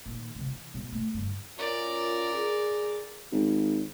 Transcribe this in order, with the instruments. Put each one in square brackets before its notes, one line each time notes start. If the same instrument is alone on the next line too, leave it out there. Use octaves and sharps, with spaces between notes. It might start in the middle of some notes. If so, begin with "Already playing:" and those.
[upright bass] A#2 D#3
G#2 C3
E3
B2 G3
A3
G2 D3
[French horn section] F#2 C#4 F4 [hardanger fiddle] A#4 D5
[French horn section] G#4
[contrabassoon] G#1